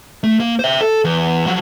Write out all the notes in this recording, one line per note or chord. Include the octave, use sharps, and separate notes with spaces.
A3
A#3
C5 E5
A4
E2
F3 F#3